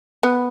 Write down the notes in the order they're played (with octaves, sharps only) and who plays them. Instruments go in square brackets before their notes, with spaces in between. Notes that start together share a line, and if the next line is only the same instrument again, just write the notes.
[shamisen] B3